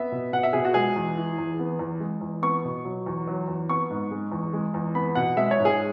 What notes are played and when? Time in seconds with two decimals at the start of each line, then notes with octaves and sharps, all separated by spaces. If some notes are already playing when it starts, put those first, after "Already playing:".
Already playing: B3 E5
0.12 B2
0.33 B2 F#5
0.43 E5
0.53 B2 G#4
0.65 F#4
0.74 G#3 G#4
0.96 E2
1.17 E3
1.38 E2
1.59 B3
1.79 E2
2.00 G#3
2.21 E2
2.42 B3 C#6
2.64 B2
2.85 F#3
3.06 E2
3.27 F#3
3.48 E2
3.69 B3 C#6
3.91 G#2
4.11 G#3
4.32 E2
4.53 G#3
4.74 E2
4.95 B3 B5
5.15 B2 F#5
5.36 G#3 E5
5.51 C#5
5.59 G#2
5.65 G#4